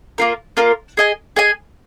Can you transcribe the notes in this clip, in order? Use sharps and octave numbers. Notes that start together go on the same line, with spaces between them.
A#3 F4 A#4
A#3 F4 A#4
G#4 D#5 G#5
G#4 D#5 G#5